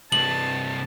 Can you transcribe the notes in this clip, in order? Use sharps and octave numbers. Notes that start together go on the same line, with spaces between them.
C2 G2 A5 F#7